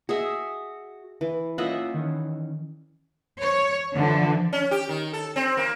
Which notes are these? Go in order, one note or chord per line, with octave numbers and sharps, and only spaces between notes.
F#4 G#4 D#5 E5
E3
A#3 C#4 F4 D#5 E5 F#5
D#3 E3 C#4
C#5
D3 E3 F3
C#4
G4
D#3
A4
C4
A#3